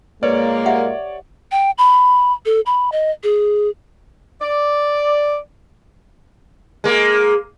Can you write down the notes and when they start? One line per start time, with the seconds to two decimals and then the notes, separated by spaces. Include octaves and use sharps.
0.23 A#2 G#3 A#3 B4 C#5 D5
0.66 G4 E5 F#5
1.52 G5
1.78 B5
2.46 A4
2.66 B5
2.92 D#5
3.23 G#4
4.41 D5
6.84 G#3 A#3